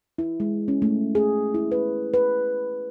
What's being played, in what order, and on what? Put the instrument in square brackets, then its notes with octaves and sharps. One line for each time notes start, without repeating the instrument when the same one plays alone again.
[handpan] E4
G#3
C#4
A3
G#4
E4
B4
B4